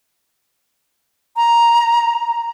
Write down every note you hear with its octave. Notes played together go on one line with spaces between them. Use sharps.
A#5